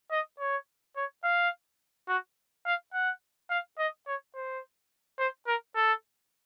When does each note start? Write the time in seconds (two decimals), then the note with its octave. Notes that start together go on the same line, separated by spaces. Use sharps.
0.11 D#5
0.40 C#5
0.96 C#5
1.24 F5
2.09 F#4
2.66 F5
2.94 F#5
3.50 F5
3.78 D#5
4.07 C#5
4.35 C5
5.19 C5
5.47 A#4
5.76 A4